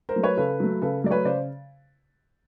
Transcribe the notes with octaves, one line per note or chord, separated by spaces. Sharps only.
A#4 C5
F#3 A3
B4 C#5
C#3 A4 B4
F#3 A3
C#3 A4 B4
F#3 A3 D5
B4 C#5
C#3 C5 D5